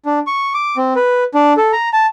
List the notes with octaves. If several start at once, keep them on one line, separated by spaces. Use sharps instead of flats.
D4
C#6
D6
C4
B4
D4
A4
A#5
A5